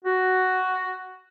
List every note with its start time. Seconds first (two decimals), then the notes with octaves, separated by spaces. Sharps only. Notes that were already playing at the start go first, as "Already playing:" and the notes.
0.05 F#4